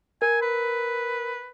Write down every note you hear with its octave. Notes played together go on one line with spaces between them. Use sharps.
A#4 G#5
B4